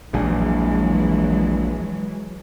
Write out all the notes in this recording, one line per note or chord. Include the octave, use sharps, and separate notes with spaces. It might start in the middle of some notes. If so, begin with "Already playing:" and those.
A#1 E2 A#2 E3 F#3 G#3